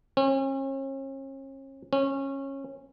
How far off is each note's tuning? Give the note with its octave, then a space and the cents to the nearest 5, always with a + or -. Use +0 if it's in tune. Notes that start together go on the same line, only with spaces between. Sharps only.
C#4 -40
C#4 -20